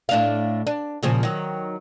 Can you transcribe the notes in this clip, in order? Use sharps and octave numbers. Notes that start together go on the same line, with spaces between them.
A2 D4 F5
D4
A#2 C#3 F3
D#3 F#3